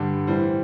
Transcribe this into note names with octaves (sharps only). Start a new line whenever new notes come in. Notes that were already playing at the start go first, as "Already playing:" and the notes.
Already playing: G2 D3 G3 G4
A2 E3 G3 C5